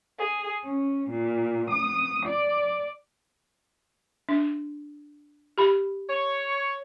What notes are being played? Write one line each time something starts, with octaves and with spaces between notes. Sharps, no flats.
G#4
C#4
A#2
D#6
D5
D4
G4 B5
C#5